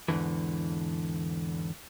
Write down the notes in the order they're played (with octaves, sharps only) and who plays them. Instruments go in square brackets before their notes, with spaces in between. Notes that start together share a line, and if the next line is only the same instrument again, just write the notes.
[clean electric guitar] E2 G#2 B2 D3 E3